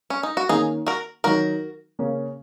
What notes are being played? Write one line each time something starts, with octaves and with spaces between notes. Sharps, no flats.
C#4
D#4
F#4
D#3 A#3 C#4 D#4 G#4
F#4 A#4
D#3 F#3 D#4 F#4 A#4
C#3 A#3 C#4